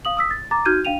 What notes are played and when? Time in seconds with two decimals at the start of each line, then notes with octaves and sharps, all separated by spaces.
0.05 F5 D#6 F#7
0.17 D#6 E6 B6
0.31 A6
0.51 A#5 D6 A6
0.65 D#4 F#4 F6 G6 G#6 D#7
0.85 D4 F5 G5 D#7 F7